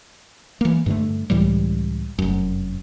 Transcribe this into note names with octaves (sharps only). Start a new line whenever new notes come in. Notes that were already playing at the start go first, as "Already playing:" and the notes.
E3 A#3
G2 D3 A3
C#2 A2 E3 G3
F1 F#2